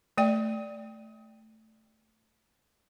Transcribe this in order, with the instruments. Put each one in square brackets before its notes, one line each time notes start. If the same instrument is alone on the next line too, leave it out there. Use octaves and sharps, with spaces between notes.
[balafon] A3 D5 G5